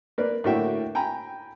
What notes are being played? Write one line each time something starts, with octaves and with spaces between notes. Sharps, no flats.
A#3 A#4 B4 D5
A2 D3 A#3 F#4 E5 G5
G5 G#5 A#5 B5